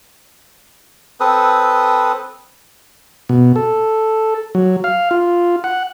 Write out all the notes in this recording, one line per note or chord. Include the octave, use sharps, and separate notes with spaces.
C4 A4 B4 D#6
B2
A4
F#3
F5
F4
F#5